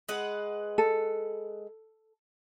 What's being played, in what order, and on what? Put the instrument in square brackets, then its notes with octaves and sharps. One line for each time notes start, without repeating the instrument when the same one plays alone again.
[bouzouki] G#3 B4 F#5
[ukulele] A4